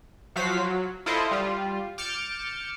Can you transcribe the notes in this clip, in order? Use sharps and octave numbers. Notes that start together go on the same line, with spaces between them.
F3 F#3 F#4 C5 F5 B6
F#3
E4 F4 A4 C5 D#5 E5
G3 F4
D6 F6 G6 A6 C#7 E7